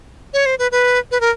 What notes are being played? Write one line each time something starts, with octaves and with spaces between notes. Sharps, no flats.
C#5
C5
B4
B4
B4
A#4